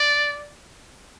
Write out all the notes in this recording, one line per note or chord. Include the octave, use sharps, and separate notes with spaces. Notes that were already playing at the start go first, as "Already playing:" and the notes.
Already playing: D5